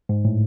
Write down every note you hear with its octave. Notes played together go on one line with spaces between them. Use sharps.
G#2
A2